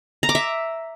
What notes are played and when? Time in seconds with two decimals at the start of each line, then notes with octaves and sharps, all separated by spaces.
0.23 A#5
0.29 D6
0.35 E5